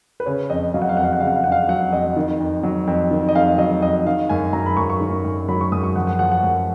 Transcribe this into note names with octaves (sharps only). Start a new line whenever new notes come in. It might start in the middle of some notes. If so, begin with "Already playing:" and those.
B4
C#3 C#5
F2 D#5
F#3 F5
F#5
F5
F2 F#5
F5
F#5
C#3 F5
F#5
F5
F2 F#5
F5
F#3 F#5
F2 D#5
D#3
F2
F#3
F2
D#3
D#5
F2 F5
F#3 D#5
F2 D#5
D#3 F5
F#2 G#5
F#3 A#5
B5
F#2 C#6
C#6
D#3
F#2
F#3 B5
C#6
F#2 D#6
C#6
F3 F#5
F#5
F3 F#5
F#5
F#2